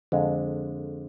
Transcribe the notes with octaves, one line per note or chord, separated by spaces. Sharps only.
F2 D3 G#3